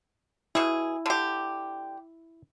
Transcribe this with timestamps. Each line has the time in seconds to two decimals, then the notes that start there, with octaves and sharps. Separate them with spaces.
0.55 B2 E4 G#4
1.06 D3 G4